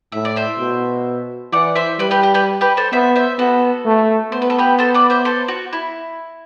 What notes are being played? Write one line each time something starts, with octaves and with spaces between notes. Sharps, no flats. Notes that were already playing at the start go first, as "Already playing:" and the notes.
A2 E5
D5
C5 E5
B2
E3 D5 F#5
C5 E5
G3 B4 D5
G4 B4
G4
G4 B4
G4 B4
A4 C5
B3 C5 E5
C5 E5
B3 F#4 A4
A3
B3 C5
B4
A4
G4 B4
A4 C5
B4 D5
C5 E5
A4 C5
F#4
E4